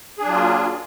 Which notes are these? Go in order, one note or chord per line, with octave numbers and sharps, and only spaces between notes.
F#3 A#3 D4 F4 G#4